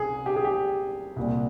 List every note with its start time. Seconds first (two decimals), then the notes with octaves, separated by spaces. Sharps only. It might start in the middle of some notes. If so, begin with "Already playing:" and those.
Already playing: C2 C3 G#4
0.26 G4
0.36 G#4
0.45 G4
1.16 C2 A#2 G3